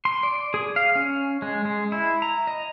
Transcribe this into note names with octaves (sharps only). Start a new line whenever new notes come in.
C6
D5
G#4
F5
C#4
G#3
G#3
E4
A#5
D#5